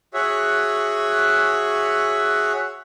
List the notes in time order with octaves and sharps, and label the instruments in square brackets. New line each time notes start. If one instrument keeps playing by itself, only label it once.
[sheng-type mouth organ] F#4 G#4 C#5 E5 F#5